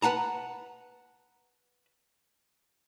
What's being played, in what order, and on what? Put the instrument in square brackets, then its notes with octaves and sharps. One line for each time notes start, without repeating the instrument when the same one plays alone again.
[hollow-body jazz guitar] B4 F#5 A5 A#5